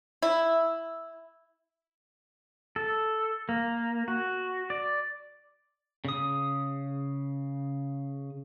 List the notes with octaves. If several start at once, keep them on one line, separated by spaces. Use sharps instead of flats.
E4
A4
A#3
F#4
D5
C#3 D#6